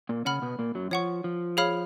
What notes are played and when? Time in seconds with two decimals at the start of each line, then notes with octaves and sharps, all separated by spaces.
0.09 A#2 A#3
0.25 C#3 C#4 F#5 B5 F6
0.42 B2 B3
0.59 A#2 A#3
0.75 F#2 F#3
0.91 F3 C#5 F#5 C#6
1.24 F3
1.57 G#4 C#5 F5 B5 F6